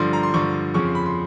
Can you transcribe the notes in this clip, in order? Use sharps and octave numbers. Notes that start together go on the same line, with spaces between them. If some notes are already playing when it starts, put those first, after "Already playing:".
Already playing: G2 D3 F3 C6
A#5
C6
G2 D3 F3 C#6
F2 C#3 F3 C#6
C6
B5
C6